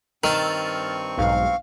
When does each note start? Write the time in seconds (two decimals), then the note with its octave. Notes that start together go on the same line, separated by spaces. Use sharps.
0.24 G2 D#3 C4 C#6 E6 F6 A6
1.18 B1 G#2 F5